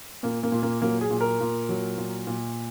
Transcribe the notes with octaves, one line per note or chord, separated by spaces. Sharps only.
A#2 A#3
A#3
A#2
A#3
F#3 A#3
G#4
A#2
A#4
A#2
F#3
A#2
A#2